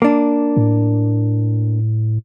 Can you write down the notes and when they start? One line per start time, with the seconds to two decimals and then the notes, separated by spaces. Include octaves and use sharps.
0.02 A#3 D4
0.57 A2